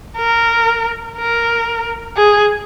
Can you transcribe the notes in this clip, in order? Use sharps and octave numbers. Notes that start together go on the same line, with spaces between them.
A#4
A#4
G#4